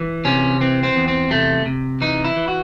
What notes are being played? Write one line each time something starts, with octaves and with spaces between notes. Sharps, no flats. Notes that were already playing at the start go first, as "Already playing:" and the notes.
Already playing: E3
C3 C#4
E3 C4
C4
E2
C4
C3 A3
C3
E3 D#4
E4
E3
F#4